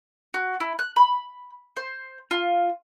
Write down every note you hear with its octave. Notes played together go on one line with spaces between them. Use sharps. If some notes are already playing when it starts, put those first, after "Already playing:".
F#4
E4
F#6
B5
C5
F4